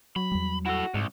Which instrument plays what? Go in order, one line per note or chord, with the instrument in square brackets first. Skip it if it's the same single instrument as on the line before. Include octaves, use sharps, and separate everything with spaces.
[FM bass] F#3 [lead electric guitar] B5
[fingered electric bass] E2 G3
[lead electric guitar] E4 A4 [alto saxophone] F#4
[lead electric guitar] C2 [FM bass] G#2